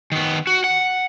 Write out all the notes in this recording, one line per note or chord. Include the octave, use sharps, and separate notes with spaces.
D#3 B3
F#4
F#5